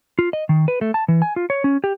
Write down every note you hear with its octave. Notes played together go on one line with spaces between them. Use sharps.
F4
D#5
D#3
B4
A3
A5
E3
G#5
F4
C#5
C#4
G4